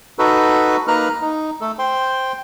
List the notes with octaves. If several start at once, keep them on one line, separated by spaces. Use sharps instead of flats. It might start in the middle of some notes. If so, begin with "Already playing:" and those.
D#4 F#4 A4 B4
A#3 D#4 B4 A#5 F6 F#6
D#4
A3 A4
C5 G5 C6